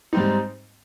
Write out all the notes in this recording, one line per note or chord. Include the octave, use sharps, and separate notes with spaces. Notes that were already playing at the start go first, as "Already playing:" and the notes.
G#2 G3 C4 D#4